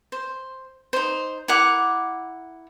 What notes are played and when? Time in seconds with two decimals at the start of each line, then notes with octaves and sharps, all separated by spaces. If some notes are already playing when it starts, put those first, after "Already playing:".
0.12 C5
0.93 D#4 C5
1.48 E4 A#4 F#5 D6